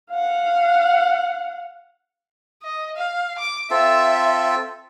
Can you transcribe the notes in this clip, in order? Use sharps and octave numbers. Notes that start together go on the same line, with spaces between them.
F5 F#5
D#5
F5
D6
C4 F4 A4 E5